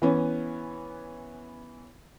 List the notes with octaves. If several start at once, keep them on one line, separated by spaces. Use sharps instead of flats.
E3 B3 C#4